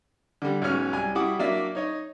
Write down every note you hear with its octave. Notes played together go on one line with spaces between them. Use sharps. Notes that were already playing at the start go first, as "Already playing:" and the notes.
D3 G3
B1 G#2 C#4 F6
C2 G#5
G3 E4 F#4 F#5 D6 D#6
F#3 A#3 D4 D5 E5
D#4 C#5 D#5